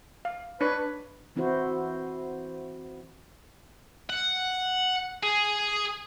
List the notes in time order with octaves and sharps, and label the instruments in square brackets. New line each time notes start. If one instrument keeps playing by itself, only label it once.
[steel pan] F5
[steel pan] D4 C#5 [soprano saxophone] B4
[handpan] E3 C4 E4 F#4 C5
[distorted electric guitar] F#5
G#4